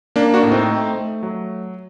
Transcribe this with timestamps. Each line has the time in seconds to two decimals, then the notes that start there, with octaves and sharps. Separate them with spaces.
0.16 A#3 D4
0.34 D4 F#4
0.43 A2
0.52 C4 D#4
0.70 A3
0.95 A3
1.23 F#3